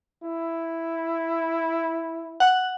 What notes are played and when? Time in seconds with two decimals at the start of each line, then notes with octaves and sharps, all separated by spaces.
0.23 E4
2.40 F#5